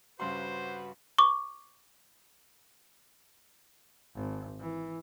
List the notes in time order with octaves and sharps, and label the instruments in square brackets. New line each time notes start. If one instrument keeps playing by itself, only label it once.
[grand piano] G2 C#3 C6 [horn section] F#4 B4 [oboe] C5
[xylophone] C#6 D6
[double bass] G#1
E3